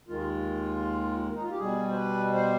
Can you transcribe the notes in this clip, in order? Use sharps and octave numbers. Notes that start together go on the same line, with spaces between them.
D#2 D#3 G#3 F4
D#4
F4
G4
B2 G3 G#4
C5
B4
C5